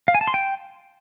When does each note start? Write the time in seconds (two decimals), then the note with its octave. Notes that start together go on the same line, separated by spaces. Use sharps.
0.08 F5
0.15 G#5
0.21 A5
0.28 C6
0.34 G5